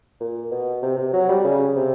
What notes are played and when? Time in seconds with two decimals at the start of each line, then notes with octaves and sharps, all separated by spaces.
0.20 A#2
0.51 B2
0.82 C3
0.98 C3
1.13 F#3
1.29 G3
1.44 C#3
1.76 C3